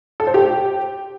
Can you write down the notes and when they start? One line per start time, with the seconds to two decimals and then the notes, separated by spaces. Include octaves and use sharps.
0.20 A4
0.27 C5
0.34 G4